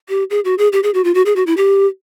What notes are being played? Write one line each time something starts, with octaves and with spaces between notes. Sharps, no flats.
G4
G#4
F#4
G#4
G4
G#4
F#4
F4
F#4
G#4
F#4
E4
G4